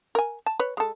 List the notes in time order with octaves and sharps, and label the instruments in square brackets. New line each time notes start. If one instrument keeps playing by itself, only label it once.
[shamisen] A#4 G#5
A5
B4 C#5
G#3 A4